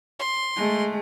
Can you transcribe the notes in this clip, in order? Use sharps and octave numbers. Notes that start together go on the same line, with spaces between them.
C6
G#3 A3